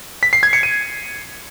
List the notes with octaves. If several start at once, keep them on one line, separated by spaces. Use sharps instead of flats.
B6
C7
G#6
C#7
D#7